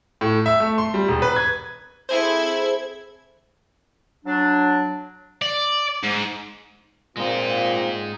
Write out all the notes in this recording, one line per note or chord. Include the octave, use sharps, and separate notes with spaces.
A2
E5
A3
C6
G3
E1
B4
G#6
C4 E4 G#4 A4 C5 G#6
F#3 D4
D5
G#2
A#2 G#3 C4 D#4 F4